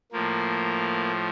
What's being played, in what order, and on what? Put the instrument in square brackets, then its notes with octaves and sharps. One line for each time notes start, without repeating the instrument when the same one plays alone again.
[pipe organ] A2 F3 A#3